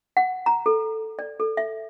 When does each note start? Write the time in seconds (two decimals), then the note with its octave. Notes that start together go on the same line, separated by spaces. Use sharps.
0.17 F#5
0.46 A#5
0.66 A4
1.19 D5
1.40 A4
1.57 E5